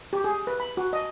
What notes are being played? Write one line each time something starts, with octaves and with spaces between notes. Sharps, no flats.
G4
G#4
B4
B5
F#4
D#5